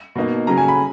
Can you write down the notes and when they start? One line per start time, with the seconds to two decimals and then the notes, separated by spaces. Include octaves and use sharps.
0.15 B2 A#3 D#4
0.47 C#3 F#3 C#4 A#5
0.57 G#5
0.68 B5